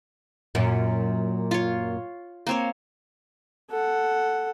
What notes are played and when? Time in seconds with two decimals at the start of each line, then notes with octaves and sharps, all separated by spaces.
0.55 F#2 A#2
1.51 F4 C#5
2.47 A#3 C4 C#5
3.70 A4 F#5